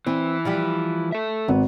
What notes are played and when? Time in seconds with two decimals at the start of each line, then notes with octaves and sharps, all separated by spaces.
0.07 E3 C4 E4
0.45 F3 G3 G4
1.12 A4 E5
1.48 G#1 B3